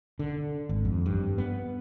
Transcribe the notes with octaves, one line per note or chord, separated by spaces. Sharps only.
D3
G#1
F2
G2
B3